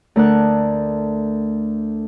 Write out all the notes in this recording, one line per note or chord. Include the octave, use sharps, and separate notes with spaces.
D2 A3 A#4 D5 F#5 F#6